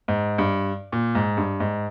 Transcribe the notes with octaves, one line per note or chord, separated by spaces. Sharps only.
G#2
G2
A#2
G#2
G2
G#2